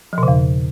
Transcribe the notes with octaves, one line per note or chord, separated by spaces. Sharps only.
F3
B2
C#3
E2